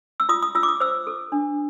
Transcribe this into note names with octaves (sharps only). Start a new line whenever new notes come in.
E6
F4 D#6
D#6
F4 E6
D6
D#6
C5 E6
A4
D4